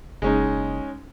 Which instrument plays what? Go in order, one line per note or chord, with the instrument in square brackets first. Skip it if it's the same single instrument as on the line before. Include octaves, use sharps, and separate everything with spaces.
[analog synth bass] F#1 [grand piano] G#3 C#4 D#4